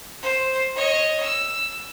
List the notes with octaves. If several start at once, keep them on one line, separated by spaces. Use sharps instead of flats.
C5
C#5 D#5
E6